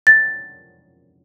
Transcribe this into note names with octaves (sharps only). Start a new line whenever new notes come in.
A6